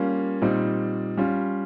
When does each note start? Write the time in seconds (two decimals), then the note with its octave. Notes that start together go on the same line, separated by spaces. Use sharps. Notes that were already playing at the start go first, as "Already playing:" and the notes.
Already playing: G3 A#3 C#4 F4
0.41 A#2 G3 C4 D#4
1.17 G3 C#4 F4